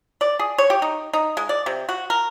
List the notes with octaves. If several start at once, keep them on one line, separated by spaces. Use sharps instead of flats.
D5
G#4
C#5
G4
D#4
D#4
G#3
D5
C3
F#4
A#4